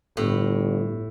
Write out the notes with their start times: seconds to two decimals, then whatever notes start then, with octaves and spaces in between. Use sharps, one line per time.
0.17 G1 A2